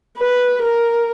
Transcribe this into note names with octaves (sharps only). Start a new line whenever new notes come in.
B4
A#4